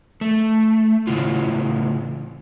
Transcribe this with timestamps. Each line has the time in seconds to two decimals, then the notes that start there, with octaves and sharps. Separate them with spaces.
0.21 A3
1.07 A2 C#3 E3 F4